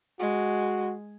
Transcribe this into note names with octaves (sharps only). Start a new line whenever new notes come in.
G#3 F#4